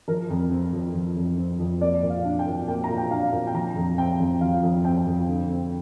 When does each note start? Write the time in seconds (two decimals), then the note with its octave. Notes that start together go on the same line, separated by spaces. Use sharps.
0.08 F3 A#4
0.30 F2
0.51 C4
0.73 F2
0.94 F3
1.16 F2
1.38 C4
1.59 F2
1.81 A#3 D5
2.03 A#2
2.10 F5
2.24 D4
2.39 G5
2.46 A#2
2.68 A#3 G5
2.84 A#5
2.89 A#2
2.98 G5
3.11 D4 F5
3.32 A#2
3.47 G5
3.54 F3 A#5
3.76 F2
3.98 C4 G5
4.20 F2
4.41 F3 F5
4.63 F2
4.84 C4 G5
5.07 F2
5.28 D3
5.49 C4